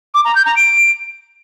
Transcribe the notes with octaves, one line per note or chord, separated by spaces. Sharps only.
D6
A#5
G6
A#5
D7